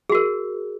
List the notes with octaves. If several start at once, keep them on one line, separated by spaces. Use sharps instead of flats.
F#4 G#4 A#4